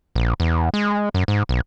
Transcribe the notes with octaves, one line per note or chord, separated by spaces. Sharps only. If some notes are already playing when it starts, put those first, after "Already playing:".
A#1
E2
G#3
F#2
G#2
B1